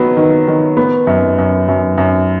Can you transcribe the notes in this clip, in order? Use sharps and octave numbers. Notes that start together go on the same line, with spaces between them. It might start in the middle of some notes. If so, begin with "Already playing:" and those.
Already playing: D#3 F#3 B3
D#3
D#3
B3
F#2
F#2
F#2
F#2